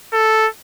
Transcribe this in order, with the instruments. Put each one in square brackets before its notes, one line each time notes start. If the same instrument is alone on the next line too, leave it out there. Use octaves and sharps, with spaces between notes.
[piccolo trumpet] A4